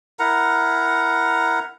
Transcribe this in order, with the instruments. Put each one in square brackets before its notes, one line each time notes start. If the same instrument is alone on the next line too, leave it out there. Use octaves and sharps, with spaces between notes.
[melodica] E4 A#4 F#5 A#5